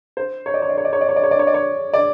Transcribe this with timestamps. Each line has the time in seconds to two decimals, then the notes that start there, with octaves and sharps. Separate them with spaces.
0.17 C5
0.46 C#5
0.54 D5
0.62 C#5
0.69 D5
0.78 C#5
0.85 D5
0.93 C#5
1.01 D5
1.09 C#5
1.16 D5
1.23 C#5
1.31 D5
1.39 C#5
1.47 D5
1.54 C#5
1.93 D5